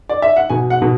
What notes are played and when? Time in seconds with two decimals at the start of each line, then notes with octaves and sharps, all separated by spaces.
0.09 D5
0.22 E5
0.37 F#5
0.50 B2 G#5
0.70 F#5
0.82 B2